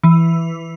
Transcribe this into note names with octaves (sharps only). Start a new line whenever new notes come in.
E3